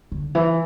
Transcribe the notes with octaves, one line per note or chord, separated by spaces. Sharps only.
D3
E3